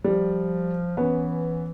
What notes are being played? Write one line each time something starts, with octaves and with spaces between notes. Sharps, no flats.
F3 G3
E3 B3 C#4